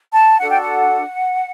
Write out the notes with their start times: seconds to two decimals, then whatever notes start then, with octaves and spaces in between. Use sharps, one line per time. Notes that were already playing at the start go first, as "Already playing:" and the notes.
0.13 A5
0.39 D4 F#4 A4 F#5
0.51 G5
0.61 F#5